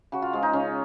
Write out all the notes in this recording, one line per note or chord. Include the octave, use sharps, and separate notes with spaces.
C#3 F#4
F4
F3 G#3
D#4
C#3 C#4